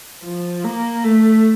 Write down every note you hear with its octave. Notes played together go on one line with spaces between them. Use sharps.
F3
A#3
A3